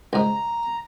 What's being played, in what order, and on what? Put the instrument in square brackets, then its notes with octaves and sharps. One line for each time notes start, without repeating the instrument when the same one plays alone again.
[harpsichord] C#2 G#2 [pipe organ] A#5